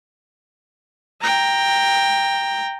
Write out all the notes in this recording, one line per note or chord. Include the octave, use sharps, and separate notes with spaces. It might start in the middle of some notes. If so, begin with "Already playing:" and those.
G5 A#5